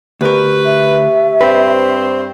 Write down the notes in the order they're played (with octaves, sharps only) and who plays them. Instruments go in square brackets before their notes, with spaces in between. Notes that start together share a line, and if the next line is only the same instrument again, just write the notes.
[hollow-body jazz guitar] D2 A#4 [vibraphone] G4 C#6 [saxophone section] B4
[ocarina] E5
[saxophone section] G2 C4 C5 [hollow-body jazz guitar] B4